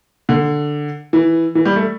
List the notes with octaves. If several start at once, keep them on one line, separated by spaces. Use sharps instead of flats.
D3
E3
E3
G3
A3